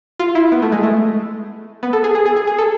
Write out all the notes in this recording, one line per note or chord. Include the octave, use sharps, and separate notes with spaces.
F4
E4
B3
A3
G#3
A3
B3
A4
G#4
G#4
G#4
G#4
G#4
A4